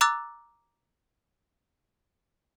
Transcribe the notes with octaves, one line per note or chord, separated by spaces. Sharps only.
A#5 D6 E6 F#6 A6